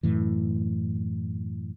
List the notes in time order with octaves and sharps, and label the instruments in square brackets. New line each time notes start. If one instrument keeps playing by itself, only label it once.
[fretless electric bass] F#2 A2 E3